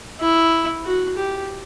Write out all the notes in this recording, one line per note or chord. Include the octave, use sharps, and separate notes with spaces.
E4
F#4
G4